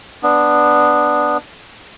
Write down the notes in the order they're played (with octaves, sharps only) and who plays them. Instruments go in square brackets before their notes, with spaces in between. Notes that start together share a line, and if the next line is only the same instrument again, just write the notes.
[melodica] B3 D4